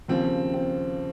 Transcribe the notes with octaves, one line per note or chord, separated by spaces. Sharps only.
D#2 C#3 F3 C4
C4